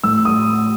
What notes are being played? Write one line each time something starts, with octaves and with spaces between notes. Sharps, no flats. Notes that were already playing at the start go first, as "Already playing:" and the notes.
A2 E6
D#6